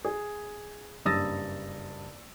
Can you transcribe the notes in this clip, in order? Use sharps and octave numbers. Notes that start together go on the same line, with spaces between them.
G#4
F#1 G2 D#6 E6 A6 A#6